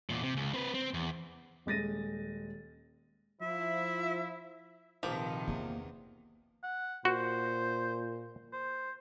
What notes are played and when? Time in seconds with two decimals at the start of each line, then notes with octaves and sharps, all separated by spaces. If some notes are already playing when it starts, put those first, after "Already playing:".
0.10 E2 A#2
0.23 C3
0.37 C#2
0.54 C4 B4
0.74 C4
0.94 E2
1.66 D#1 G#3 A6 A#6 D#7
3.41 F3 E4 E5
5.03 A#1 C3 D#3 F3 B4 D6
5.48 E2 A#3
6.63 F#5
7.05 A#2 F#4 C5
8.53 C5